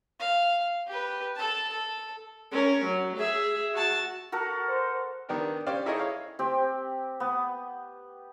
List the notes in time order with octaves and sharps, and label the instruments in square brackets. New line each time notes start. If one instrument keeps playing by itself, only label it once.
[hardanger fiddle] F5
G4 B4
A4 A5
A4
[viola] C#4 A#4
F#3
G#4 E5
F#4 A5
[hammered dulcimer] F#4 A4 A#4
[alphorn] C5
[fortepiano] D#3 B3 D4 G4 A#4
C#4 G4 C5 D5 F5
D#4 E4 G#4 A4 C#5 D#5
C#5 F5
[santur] C4 G4
B3